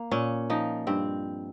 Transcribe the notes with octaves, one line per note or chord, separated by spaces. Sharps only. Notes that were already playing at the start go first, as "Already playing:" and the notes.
Already playing: A#3
A#2 C#4
F3 D#4
G2 C4